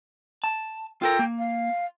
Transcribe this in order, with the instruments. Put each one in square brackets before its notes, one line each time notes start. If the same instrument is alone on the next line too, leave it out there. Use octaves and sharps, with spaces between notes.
[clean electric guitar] A5
[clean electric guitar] F4 A4 A#4 [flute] G5
[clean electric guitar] A#3
[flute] F5